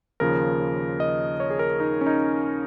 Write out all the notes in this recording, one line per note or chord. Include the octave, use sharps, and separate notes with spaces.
D#2 C#3 F3 A#4
D#5
C#5
G#4
A#4
D#4
C#4
D#4